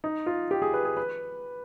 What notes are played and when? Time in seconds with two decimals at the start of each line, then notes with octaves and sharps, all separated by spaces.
0.04 D#4
0.26 F4
0.51 G4
0.62 G#4
0.74 B4
0.85 G#4
0.97 B4